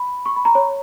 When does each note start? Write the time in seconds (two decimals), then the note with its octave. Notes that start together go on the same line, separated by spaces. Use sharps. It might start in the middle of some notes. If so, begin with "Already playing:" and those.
Already playing: B5
0.26 C#6
0.36 B5
0.45 A#5
0.55 C#5